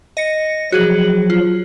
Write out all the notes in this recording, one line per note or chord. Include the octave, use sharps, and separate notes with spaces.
D#5 A#6 C#7
F3 F#3 F#4 G#4 F#7
F4